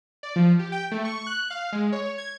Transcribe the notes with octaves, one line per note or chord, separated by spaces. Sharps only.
D5
F3
G4
G5
A3
C#6
F#6
F5
G#3
C#5
G#6